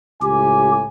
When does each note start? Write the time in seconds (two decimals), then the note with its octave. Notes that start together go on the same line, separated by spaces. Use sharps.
0.22 C#2 A2 G4 G#5